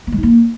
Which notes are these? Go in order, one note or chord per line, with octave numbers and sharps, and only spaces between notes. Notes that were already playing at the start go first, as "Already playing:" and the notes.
B3
G#3
D#4
A#3